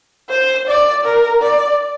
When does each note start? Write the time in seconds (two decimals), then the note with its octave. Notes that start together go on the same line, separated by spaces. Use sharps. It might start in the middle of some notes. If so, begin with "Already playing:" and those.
0.30 C5
0.68 D5
1.05 A#4
1.43 D5